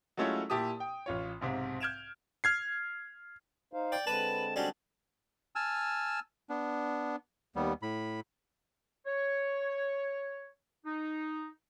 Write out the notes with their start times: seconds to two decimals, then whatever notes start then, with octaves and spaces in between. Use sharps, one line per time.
0.17 F#3 G#3 A3 C#4 E4 F4
0.50 A#2 E4 G4 A5 D#6
0.80 G5
1.06 A1 F4 C#5
1.41 B1 G#2 C3
1.80 F6 G6 G#6 D7 E7 F7
2.44 F6 G#6 C7
3.73 D#4 C5 F5
3.92 D5 G5
4.07 D3 G#3 C4 B4 A5
4.56 F#3 G3 C#4 D4
5.55 G#5 A5 E6 F6
6.49 B3 D4
7.56 D#2 G3 B3
7.82 A2 B5
9.06 C#5
10.86 D#4